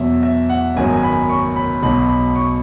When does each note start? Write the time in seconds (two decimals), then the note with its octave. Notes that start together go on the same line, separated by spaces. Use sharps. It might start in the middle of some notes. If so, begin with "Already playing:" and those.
Already playing: E2 B2 F#3 E5
0.23 E5
0.49 F#5
0.76 G#1 F#2 F#3 B3 G#5
0.97 G#5
1.03 B5
1.29 C#6
1.56 B5
1.82 B1 B2 F#3 B5
2.09 B5
2.35 C#6